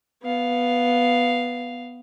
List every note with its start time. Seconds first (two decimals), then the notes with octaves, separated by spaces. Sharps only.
0.23 B3 F5